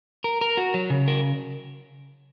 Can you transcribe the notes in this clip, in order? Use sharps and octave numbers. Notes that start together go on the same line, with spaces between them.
A#4
A#4
F#4
F#3
C#3
A#4